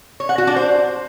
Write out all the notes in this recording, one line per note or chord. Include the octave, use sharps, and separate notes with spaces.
C#5
F#5
F#4
D4
C5